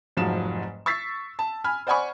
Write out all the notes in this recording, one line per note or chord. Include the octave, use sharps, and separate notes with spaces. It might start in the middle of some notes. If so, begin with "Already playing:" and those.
F1 G#2 F3 F#3 E7
C#6 E6 A6 B6 C7
A5
G#5 B5 F6
C5 D5 F#5 G#5 B5 C#6